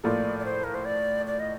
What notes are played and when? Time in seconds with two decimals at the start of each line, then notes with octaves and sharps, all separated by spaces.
0.04 A2 F3 A#3 F4 A4 D5
0.39 D5
0.45 C5
0.64 A#4
0.74 C5
0.85 D5
1.27 D5
1.39 D#5